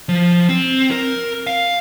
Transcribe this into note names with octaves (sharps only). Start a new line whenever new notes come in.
F3
C4
A#4
F5